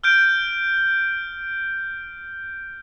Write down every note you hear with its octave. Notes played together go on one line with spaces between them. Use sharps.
F6 G6 D7